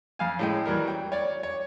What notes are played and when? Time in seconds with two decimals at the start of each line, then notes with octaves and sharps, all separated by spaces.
0.19 F2 F5 G#5
0.39 A2 G#3 G5
0.66 E3 F#3 G3 A#4
0.88 G5
1.12 C#5 D5
1.43 C#5